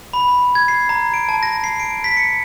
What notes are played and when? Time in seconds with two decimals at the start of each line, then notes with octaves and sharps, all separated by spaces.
0.13 B5
0.28 B5
0.55 G#6
0.68 C7
0.89 A#5
1.14 D7
1.29 A5
1.43 A#6
1.64 C7
1.80 D7
2.04 B6
2.17 C#7